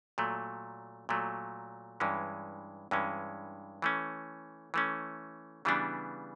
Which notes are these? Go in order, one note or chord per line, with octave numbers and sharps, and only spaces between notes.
A#2 F#3 A3
A#2 F#3 A3
G2 E3 G#3 C#4
G2 E3 G#3 C#4
E3 A3 C#4
E3 A3 C#4
C#3 E3 G3 B3 D4